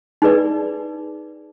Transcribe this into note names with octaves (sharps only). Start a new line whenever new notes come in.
D#4 G#4 B4 D5